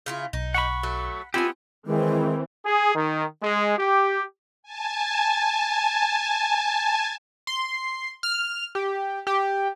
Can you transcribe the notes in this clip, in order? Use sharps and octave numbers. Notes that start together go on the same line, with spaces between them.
C#3 E4 F4
B1 D#4
F#5 B5 C#6
F#3 A3 A4
B3 C4 E4 F4 G4 G#5
D#3 E3 G#3 C4
G#4
D#3
G#3
G4
G#5 A5
C6
F6
G4
G4